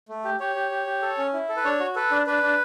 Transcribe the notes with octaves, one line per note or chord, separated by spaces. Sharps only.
A3
G4
G4 C#5
G4
G4
G4
A4
C#4
E4
A4
B4
D4 C#5
F#4
A4 B4
D4
D4 B4
D4